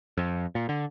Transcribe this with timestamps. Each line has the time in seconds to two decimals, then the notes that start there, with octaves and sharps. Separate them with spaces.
0.17 F2
0.55 A#2
0.69 D3